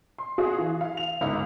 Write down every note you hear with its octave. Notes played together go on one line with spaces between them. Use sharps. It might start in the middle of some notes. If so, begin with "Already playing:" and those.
C6
F#4 G#4 F5
E3
F5
F7
G1 C#2 G#2 F5